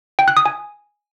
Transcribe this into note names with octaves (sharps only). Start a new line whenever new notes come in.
G5
F#6
D#6
G#5